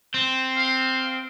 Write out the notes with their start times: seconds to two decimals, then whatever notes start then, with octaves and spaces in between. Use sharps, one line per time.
0.14 C4
0.57 F5